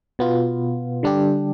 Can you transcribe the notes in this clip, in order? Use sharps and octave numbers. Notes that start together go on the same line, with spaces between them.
B2 B3 F4
D3 G3 D4 G4